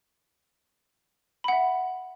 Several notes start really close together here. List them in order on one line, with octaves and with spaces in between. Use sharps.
B5 F#5 E5